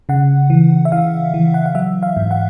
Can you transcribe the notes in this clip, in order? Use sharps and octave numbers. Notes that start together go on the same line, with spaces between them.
C#3 F#5
E3
E5
E3 F5
E3
F#5
F5
F#3 E5
F5
G#2
F#5